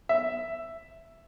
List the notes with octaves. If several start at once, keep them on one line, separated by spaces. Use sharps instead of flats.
E5